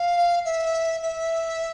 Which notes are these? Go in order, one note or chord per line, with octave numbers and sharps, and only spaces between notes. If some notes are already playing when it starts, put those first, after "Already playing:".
Already playing: F5
E5
E5